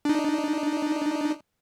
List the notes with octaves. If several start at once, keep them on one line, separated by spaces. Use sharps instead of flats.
D4 D#4